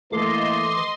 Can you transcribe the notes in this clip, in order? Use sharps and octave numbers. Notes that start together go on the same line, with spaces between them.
E3 A3 A#3 E4 A4 D#5 C6 D6